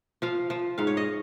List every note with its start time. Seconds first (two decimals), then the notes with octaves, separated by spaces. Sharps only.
0.22 F3 F5
0.50 F3
0.78 G#2 F5
0.87 C#5
0.97 D#5